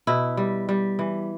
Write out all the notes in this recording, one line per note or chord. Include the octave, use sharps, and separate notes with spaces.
B2 E4
G3
G3
E3